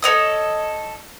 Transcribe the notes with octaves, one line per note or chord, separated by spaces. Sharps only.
A4 C#5 D#5 D#6